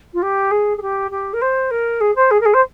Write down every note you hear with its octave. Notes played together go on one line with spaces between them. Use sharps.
F4
G4
G#4
G#4
G4
G4
A#4
C5
A#4
G#4
C5
G#4
A#4
G#4
C5